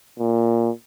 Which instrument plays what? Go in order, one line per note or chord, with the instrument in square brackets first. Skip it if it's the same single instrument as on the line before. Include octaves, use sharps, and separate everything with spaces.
[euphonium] A#2